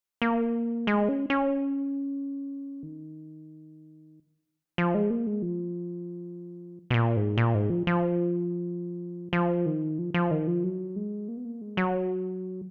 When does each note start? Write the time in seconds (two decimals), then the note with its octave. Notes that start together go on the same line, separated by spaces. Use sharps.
0.22 A#3
0.87 G#3
1.09 C#4
1.30 C#4
2.83 D#3
4.78 F3
4.95 G#3
5.10 A#3
5.27 G#3
5.42 F3
6.90 B2
6.94 A#2
7.17 G#2
7.38 A#2
7.55 G#2
7.70 F3
7.87 F3
9.33 F3
9.66 D#3
9.99 F3
10.14 F3
10.31 D#3
10.47 F3
10.64 F#3
10.96 G#3
11.28 A#3
11.37 B3
11.45 A#3
11.61 G#3
11.77 F#3